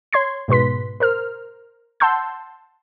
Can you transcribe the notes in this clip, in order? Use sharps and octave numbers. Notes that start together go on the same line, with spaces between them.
C#5 C6 G#6 C7
G#2 B2 B4 C6 B6
A#4 C5 F6
F#5 A5 C6 E6 G6